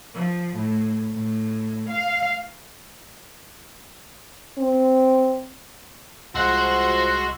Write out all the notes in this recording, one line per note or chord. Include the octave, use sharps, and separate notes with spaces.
F3
A2
A2
F5
C4
C2 F3 G#3 F#4 F#5 C6 E6